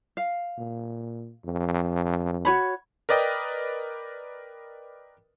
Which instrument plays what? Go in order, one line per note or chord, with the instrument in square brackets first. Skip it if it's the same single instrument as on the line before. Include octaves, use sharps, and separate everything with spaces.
[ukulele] F5
[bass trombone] A#2
F2
[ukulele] F#4 C#5 B5
[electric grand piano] A#4 B4 D5 D#5 G5